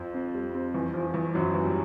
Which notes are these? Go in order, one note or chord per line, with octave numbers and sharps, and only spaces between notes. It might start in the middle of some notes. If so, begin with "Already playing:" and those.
Already playing: F2 F3
C4
G3
C4
E2
F3
E2
F#2 F3 F#3
E2
G3